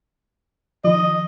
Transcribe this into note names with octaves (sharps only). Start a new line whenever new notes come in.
D#3 F3 D#5